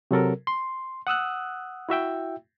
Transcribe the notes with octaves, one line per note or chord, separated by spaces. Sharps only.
C3 F#3 A4 A#4
C6
F#5 D#6 E6 F#6
E4 F#4 E5 G5